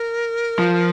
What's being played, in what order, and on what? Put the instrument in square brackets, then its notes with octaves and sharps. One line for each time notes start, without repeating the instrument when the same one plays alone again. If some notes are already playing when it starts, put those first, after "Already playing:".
Already playing: [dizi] A#4
[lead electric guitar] F3